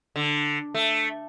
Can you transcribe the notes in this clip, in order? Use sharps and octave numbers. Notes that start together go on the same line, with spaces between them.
D3
A3